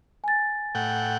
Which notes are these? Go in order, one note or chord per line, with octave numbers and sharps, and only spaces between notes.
G#5 A6
A2 F#5 G5